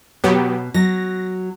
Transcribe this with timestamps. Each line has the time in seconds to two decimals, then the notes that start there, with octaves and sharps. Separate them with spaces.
0.24 B2 F#3 B3 G4
0.74 F#3 A#6